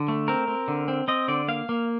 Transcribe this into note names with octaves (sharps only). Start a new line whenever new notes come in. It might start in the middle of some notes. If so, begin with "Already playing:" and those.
Already playing: D3
A3
C4 A#4
C4
D3
C4
C4 D#5
D3 D5
A#3 F5
A#3